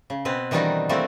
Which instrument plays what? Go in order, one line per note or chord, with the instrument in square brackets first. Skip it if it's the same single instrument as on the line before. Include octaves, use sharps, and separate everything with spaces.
[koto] C#3
B2 C4 B4
D#3 E3 G3 D4 D#4 F#4
G3 A3 A#3 C4 E4 F#4